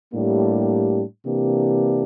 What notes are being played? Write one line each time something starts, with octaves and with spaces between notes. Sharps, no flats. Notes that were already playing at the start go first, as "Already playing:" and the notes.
A2 G3 A#3 D4 G4
C3 E3 A#3 D4 G4